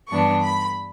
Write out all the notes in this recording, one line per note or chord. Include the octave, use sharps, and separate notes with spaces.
G2 E3 G3 B3 D4 C#6
B5